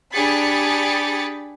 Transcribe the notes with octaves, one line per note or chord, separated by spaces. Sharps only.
D4 G4 G#4 B5 A6 C#7